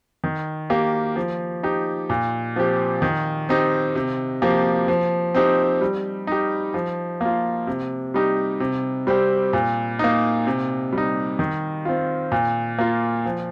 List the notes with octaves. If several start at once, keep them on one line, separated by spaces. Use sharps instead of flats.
D#3
A#3 G4
F3
D#4 G4
A#2
F3 C4 G4
D#3
C4 D#4 G4
C3
F3 A#3 G4
F3
C4 D#4 G4
G3
D#4 G4
F3
A#3 F4
C3
G3 D#4 G4
C3
G3 C4 G4
A#2
A#3 D#4
C3
G3 D#4
D#3
C4 F4
A#2
A#3 F4
F3